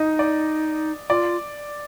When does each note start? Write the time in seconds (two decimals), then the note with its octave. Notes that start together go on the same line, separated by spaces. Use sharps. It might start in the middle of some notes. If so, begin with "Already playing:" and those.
Already playing: D#4 D#5
0.19 D5
1.10 F4 D5